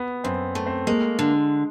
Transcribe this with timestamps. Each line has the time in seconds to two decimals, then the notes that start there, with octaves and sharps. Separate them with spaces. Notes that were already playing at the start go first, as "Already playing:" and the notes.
Already playing: B3
0.24 F#2 C4
0.55 A3
0.67 C4
0.87 G#3 A#3
1.19 D3